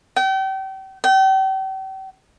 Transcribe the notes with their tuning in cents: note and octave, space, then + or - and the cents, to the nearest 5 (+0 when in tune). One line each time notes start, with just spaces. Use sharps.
G5 -35
G5 -40